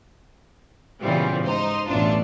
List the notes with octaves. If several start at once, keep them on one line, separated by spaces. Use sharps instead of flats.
A#2 C#3 E3 G3 B3 C4
G#2 D#4 C5
A1 F#2 B2 D4 F4